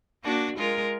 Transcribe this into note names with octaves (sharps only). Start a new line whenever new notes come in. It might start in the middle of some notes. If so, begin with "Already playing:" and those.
A#3 D4 F#4
G#3 F4 A#4